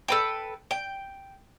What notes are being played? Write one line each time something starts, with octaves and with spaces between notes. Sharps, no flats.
A4 B4 G5
G5